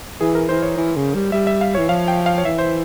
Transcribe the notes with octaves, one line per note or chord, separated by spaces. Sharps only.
E3 G#4
A#4
E3 C5
C#5
E3
C#3
G3
G3 E5
E5
F5
E3 C#5
F3 F5
G5
F5
C#5
E3 E5
C5